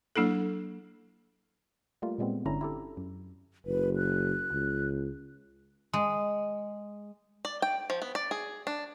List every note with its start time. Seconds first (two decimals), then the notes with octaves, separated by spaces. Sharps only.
0.16 F#3 A#3 D4 E4 A4
2.02 G3 A3 A#3 F4
2.18 A#2 G3 G#3 B3 C4
2.45 G1 D3 C#4 D4 E4 A#5
2.61 E4 G4 A4
2.97 F#2
3.66 F#1 B4
3.97 F#6
4.53 C#2
5.93 G#3
7.45 D5
7.62 G5
7.90 F3
8.02 B3
8.15 D5
8.31 G#4
8.67 D4